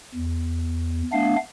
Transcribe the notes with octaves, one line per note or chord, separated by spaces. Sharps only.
E2
A3 B3 D4 F5